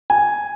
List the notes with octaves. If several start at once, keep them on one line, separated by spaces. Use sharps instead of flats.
G#5